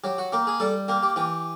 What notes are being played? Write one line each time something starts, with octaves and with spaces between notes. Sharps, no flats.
F#3 G4
F#4
A#3 G4
G#4
G3 A4
A#3 G4
G4
E3 G4